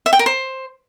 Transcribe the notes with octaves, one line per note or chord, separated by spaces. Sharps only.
E5
G5
A#4
C5